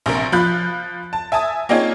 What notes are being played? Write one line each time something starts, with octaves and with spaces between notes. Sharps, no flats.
A#1 C3 A#4
F3 F4 B5 F#6 G6
A5
E5 G#5 A5 D#6
A#3 C4 C#4 D#4 F4 G#4